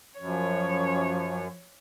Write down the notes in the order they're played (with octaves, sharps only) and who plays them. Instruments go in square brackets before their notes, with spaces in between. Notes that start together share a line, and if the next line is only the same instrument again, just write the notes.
[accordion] F#2 [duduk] F3 [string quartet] C#5